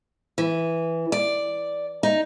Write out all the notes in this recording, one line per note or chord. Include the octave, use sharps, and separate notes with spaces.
E3
D5
D#4